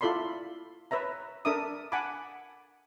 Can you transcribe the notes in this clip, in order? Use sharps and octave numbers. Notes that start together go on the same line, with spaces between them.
E4 F4 A4 D5 B5 C6
B4 C#5 E5 A#5
D4 A4 A#4 E5 D6 D#6
F#5 G#5 A5 B5 D6